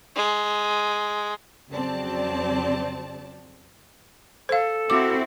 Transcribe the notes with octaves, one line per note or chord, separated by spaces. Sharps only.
G#3
F2 C#3 F#3 C4 D5 A5
A4 C5 F5
C4 E4 F#4 D6